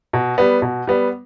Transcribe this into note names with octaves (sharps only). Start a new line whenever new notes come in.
B2
G3 B3
B2
G3 B3